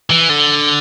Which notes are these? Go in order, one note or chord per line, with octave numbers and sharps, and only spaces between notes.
E3
D3